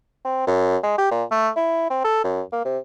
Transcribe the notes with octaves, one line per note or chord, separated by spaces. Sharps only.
C4
F#2
G#3
G4
A#2
A3
E4
C4
A4
F#2
A#3
C3